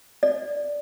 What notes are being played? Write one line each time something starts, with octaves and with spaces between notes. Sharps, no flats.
D5